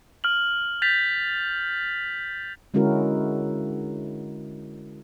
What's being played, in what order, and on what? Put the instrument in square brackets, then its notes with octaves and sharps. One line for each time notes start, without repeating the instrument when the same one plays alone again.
[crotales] F6 F#7
G6 A6 B6 F7
[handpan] D3 G#3 C#4 E4 F#4 A#4